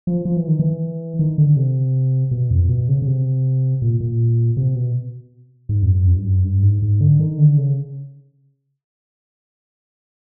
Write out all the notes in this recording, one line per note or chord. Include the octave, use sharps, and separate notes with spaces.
F3
F3
E3
D#3
E3
D#3
D3
C3
B2
F2
B2
C#3
C#3
C3
A#2
A#2
C3
B2
G#2
F2
F#2
F2
G2
F#2
G2
G#2
G#2
D3
D#3
D3
C#3